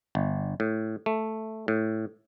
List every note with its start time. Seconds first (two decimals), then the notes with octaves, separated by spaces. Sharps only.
0.15 G1
0.60 A2
1.06 A3
1.68 A2